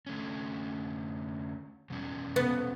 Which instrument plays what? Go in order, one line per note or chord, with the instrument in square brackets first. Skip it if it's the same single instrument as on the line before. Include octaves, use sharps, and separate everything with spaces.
[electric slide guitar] D3 A3 C#4
E2 B2 G3 C#4
[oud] B3